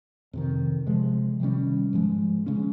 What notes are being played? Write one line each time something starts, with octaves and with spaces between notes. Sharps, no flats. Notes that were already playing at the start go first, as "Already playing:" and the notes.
F2 C3 D#3
C3 F3 G#3
C3 D#3 G3 C#4
G#2 F3 G#3
C#3 G#3 C#4